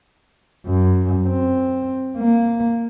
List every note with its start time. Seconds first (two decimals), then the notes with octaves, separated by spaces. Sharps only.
0.67 F#2
1.26 C4
2.17 A#3